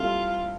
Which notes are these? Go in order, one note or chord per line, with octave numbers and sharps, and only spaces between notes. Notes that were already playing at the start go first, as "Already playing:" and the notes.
Already playing: G3 C4 E4 F4 A4